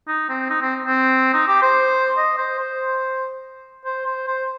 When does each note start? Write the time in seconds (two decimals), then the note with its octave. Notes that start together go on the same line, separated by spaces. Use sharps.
0.08 D#4
0.29 C4
0.50 D#4
0.62 C4
0.86 C4
1.34 D#4
1.47 G4
1.62 C5
2.17 D#5
2.38 C5
2.59 C5
3.85 C5
4.06 C5
4.27 C5